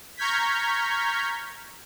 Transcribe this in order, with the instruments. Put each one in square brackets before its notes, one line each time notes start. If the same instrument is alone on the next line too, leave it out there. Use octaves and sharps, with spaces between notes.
[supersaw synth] A#5 C#6 F6 G6 G#6 B6